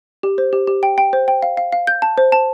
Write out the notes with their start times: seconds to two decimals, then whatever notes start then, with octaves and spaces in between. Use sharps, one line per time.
0.23 G4
0.38 C5
0.53 G4
0.67 G4
0.83 G5
0.98 G5
1.13 C5
1.28 G5
1.43 F5
1.57 F5
1.72 F5
1.87 G6
2.02 A5
2.18 C5
2.32 A5